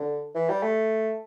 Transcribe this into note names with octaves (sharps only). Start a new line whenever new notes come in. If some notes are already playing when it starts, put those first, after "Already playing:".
Already playing: D3
E3
G3
A3